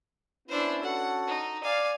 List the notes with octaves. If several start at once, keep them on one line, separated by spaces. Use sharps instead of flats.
B3 C#4 D4 E4 C5
C#4 F#4 A4 F#5
D#4
D5 F5 G#5